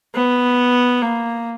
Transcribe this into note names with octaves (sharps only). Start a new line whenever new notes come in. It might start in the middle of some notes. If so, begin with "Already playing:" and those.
B3
A#3